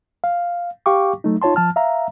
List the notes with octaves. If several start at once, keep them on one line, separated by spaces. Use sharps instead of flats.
F5
G4 F5 G5 C#6 D6
F#3 A3 D#4
D#4 F4 C#5 A5 C6
F3 A5 F6
E5 F5 A#5